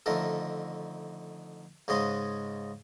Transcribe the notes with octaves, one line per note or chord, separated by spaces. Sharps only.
F2 D3 D#3 A3 A#4
G#2 C#3 G#3 C#4 D#5 C6